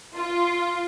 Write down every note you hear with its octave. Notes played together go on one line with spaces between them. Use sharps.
F4